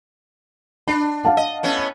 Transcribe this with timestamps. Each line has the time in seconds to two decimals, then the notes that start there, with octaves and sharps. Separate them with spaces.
0.88 D4 B5
1.25 F5 F#5 A5
1.37 D#5
1.63 A2 B3 C#4